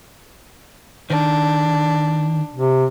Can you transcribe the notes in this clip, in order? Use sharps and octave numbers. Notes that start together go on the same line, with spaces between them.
D#3 D4
C3